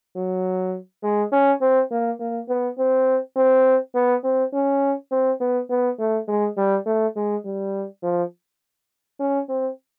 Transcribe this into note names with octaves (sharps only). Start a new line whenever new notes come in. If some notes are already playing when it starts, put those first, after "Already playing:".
F#3
G#3
C#4
C4
A#3
A#3
B3
C4
C4
B3
C4
C#4
C4
B3
B3
A3
G#3
G3
A3
G#3
G3
F3
C#4
C4